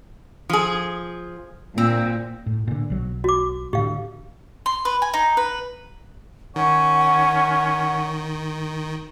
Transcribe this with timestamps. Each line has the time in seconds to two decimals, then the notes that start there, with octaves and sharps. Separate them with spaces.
0.49 F3 G#4
1.78 A#2 C4
2.46 A2
2.67 A#2 D3
2.90 B1 F#3
3.24 F#4 D6
3.73 A2 D3 G4 F5
4.66 C6
4.85 B4
5.02 G#5
5.14 D#4
5.37 B4
6.56 D#3 C#4 F#5